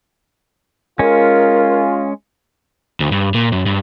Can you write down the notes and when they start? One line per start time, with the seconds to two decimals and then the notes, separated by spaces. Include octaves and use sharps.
0.99 G#3 C#4 F4 A#4
3.00 D2
3.12 G2
3.34 A#2
3.52 F#2
3.66 G2